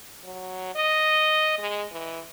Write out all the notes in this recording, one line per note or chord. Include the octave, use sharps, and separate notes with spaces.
F#3
D#5
G#3
E3